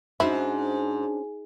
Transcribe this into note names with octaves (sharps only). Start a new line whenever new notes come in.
G#2 C#4 D4 E4 F#4 C5